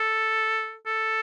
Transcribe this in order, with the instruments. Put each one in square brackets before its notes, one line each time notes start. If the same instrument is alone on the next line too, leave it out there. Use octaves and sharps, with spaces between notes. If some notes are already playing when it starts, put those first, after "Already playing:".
Already playing: [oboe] A4
A4